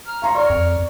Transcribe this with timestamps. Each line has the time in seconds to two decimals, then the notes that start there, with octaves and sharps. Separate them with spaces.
0.07 A#5 F6
0.22 C#5 F5 A#5 C6
0.35 A#4 C#5 D5 C#6 F6
0.50 F2